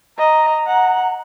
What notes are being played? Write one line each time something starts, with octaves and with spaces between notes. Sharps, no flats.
D#5 A#5
F#5